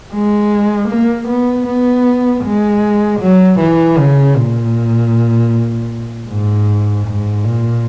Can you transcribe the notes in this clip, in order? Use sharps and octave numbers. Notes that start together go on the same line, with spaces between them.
G#3
A#3
B3
B3
G#3
F#3
E3
C#3
A#2
G#2
G#2
A#2